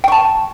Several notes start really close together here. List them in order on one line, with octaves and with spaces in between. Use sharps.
G5 C#6 A5